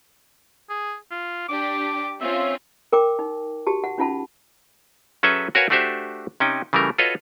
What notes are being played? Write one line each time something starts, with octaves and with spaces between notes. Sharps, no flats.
G#4
F4
D4 G4 D6
C4 C#4 F4 E5
A#4 G5 D6
D#4
F#4 G4 A5
F#5
C#4 D#4 F4 F#5 A5 B5
F#3 C#4 G#4 A4 B4 E5
F#4 A#4 B4 C#5 F5 G#5
A3 D4 F#4 G4 C5 E5
C3 C#4 D#4 G5
C#3 E3 G3 A3 A#4
F4 F#4 A4 B4 C#5 D#5